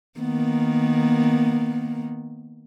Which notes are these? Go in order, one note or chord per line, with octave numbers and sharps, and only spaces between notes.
D#3 A#3 B3